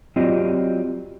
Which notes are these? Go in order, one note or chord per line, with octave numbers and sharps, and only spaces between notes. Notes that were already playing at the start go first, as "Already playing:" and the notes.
F#3 C4 F4 G4 D5 D#5